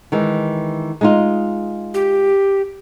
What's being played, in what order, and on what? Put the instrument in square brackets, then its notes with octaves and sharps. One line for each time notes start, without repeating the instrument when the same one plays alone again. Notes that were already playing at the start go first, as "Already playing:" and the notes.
[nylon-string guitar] D#3 E3 G#3
G#3 D#4 F4
[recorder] G4